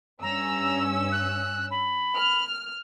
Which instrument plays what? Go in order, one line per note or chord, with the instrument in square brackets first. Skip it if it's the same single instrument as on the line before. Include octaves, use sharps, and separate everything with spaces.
[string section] G2 C#4 E6 [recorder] A#5
[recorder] F#6
B5
[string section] F6